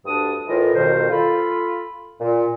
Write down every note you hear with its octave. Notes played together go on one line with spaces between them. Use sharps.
D2 G2 D4 D#6
A2 E3 F4 A#4 D#5
C2 F2 B2 D#3 A#4 C5
F4 A4 B5
A#2